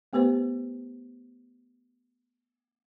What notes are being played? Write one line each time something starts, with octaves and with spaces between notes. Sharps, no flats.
A3 B3 G4 B4 C5